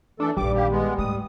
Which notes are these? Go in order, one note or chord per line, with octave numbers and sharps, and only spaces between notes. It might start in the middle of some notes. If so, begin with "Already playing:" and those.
E3 A3 D4 A4
A#1 G2 D#3 G3 D6
A#3 G4
G#3 B3
G#2 A3 D#6